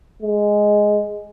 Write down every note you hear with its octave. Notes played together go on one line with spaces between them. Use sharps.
G#3